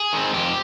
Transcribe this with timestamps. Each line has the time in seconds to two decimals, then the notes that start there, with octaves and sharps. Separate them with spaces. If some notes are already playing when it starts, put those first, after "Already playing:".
Already playing: G#4
0.13 D#3 G#3 C4
0.34 F2 G4